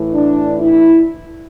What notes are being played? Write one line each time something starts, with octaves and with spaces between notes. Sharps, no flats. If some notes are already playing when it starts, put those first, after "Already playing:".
Already playing: A2 E3
D4
E4